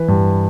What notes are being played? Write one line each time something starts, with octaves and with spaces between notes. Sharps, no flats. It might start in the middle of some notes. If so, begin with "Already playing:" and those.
Already playing: E3 B4
G2